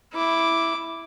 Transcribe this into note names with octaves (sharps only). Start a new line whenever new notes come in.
E4 D6